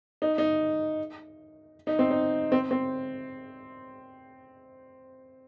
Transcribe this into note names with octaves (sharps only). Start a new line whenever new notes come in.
D#4
D#4
D#4
C4
D#4
C4
C4